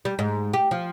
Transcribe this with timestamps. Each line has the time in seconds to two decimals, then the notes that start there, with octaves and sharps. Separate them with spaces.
0.05 G3
0.19 G#2
0.53 G4
0.71 F3